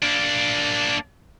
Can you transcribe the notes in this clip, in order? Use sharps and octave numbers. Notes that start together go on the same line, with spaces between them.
A#3 D4